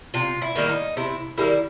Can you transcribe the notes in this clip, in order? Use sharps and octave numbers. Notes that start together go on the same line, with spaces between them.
C3 F4
E4
D#3 G3 A#3
D#4
C3 E4
D#3 G3 A#3 E4